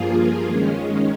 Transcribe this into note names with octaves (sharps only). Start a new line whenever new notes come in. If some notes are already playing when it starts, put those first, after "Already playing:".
Already playing: G2 F3 A#3 F4 G#4
D#3 G#3 C#4